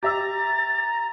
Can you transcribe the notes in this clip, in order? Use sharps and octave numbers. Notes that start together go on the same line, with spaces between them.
G4 E5 A#5 E6 A6